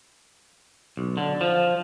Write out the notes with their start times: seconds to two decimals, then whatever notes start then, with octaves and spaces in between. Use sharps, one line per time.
0.97 B1
1.17 D3
1.41 F3